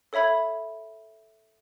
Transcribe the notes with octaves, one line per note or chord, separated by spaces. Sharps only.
A4 C#5 E5 B5 G#6